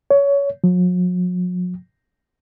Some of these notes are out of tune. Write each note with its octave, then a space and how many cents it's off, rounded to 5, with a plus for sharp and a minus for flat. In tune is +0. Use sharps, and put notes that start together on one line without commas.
C#5 +20
F#3 -45